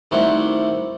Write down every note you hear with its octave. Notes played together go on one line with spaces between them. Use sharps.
D#3 G3 A3 C4 E4 F#4